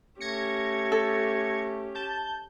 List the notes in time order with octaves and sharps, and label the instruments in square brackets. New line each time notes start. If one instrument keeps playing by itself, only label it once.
[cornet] A3 [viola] C#4 G4 [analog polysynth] G#6 A#6 C#7
[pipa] A4
[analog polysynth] A5 G6